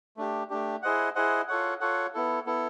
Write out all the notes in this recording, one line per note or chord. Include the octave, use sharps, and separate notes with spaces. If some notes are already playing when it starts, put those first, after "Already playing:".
A3 D4 G4
A3 D4 G4
E4 G#4 C5 D#5 F#5
E4 G#4 C5 D#5 F#5
F4 A4 C#5 F#5
F4 A4 C#5 F#5
B3 E4 A4
B3 E4 A4